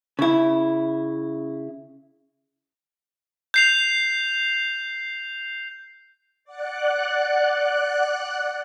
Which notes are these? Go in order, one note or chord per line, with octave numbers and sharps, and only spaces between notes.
C#3 E4
G6 C7 F7
D5 F#5 F#6